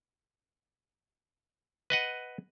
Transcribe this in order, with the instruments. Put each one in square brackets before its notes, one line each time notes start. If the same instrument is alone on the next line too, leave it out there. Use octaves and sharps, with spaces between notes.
[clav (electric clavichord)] B4 D#5 F#5